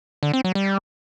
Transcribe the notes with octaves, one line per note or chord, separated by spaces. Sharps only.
D3
C4
F#3
G3